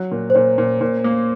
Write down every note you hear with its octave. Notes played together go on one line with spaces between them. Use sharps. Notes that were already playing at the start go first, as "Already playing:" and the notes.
Already playing: F#3
A#2
C5
A#2 C#5
A#2
A#2
A#3